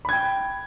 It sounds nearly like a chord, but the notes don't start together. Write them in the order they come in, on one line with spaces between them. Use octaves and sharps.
B5 G#6 G5